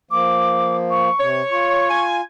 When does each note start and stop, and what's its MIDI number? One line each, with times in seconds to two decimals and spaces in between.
0.11 1.09 53
0.11 1.09 58
0.11 0.76 86
0.90 1.28 85
1.20 1.42 48
1.20 1.84 73
1.51 2.21 65
1.51 2.04 85
1.89 2.21 80